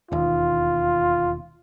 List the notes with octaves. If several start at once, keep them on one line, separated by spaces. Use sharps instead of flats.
E1 D#2 F4